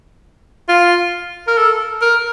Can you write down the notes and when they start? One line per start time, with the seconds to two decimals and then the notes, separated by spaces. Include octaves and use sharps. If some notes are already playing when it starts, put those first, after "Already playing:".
0.69 F4
1.48 A#4
1.57 A4
2.01 A#4